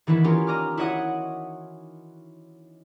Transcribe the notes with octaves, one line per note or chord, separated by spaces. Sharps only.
D#3 E3 B3 E4 B4
B3 C#4 D#4 F4 G4 A#4
D#5 A#5 D6 F6
E4 F#4 C#5 D#5 F#5 D#6